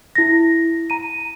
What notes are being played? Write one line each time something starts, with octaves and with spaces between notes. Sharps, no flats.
E4 A#6
A#5 D#7